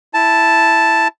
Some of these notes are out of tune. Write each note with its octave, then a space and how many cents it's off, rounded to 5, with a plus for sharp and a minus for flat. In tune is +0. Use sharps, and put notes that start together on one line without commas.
E4 +0 A5 +0